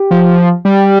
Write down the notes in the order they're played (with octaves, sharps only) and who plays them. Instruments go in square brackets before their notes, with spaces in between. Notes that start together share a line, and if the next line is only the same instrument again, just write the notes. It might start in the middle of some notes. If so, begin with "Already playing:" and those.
Already playing: [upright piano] G4
[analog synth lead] F3
G3